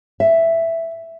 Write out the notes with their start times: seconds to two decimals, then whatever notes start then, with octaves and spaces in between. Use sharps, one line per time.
0.20 E5